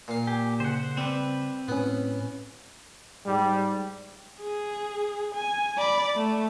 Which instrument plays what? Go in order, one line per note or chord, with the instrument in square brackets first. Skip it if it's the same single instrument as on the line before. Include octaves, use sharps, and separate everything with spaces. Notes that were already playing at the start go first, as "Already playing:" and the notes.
[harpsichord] A#2 F5
[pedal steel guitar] G4 [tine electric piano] G#5
[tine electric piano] C#3 [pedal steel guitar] C5 F#5
[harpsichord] G3 [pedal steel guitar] C4 B4
[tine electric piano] A2 C#4 [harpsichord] B3
[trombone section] G#2 G3 G4
[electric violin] G#4
G#5
D5 B5
A3